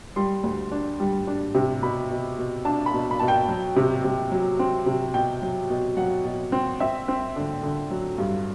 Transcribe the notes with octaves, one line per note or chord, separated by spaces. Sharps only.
G3 C6
D2
D4
G3
D4
C3
B2 B5
B2
B2
D4 A5
B5
B2
B5
B2 A5
G5
F#3
C3
C3
F#3
C4
C3
B2 G5
F#3
B2
F#3 F#5
B2
C4
C4 E5
C4
D3
D3
F#3
G2